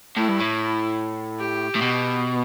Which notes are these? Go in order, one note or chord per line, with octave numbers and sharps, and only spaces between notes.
A2 E4
G2
A2
G4
A2
B2